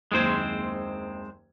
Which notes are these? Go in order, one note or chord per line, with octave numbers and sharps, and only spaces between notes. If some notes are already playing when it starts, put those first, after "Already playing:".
F#1 D#2 G#3 C4 C5 G#6